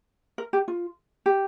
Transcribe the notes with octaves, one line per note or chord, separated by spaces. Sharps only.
A#4
G4
F4
G4